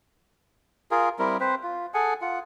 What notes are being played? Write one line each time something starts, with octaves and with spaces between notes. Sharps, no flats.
F4 G#4 A#4
G3 C4 E4 A#4
C4 B4 C5
F4
G#4 A4 F#5 G#5
F4 F#5